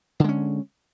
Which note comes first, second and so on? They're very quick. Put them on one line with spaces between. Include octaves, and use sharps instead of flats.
D3 G#3 C#4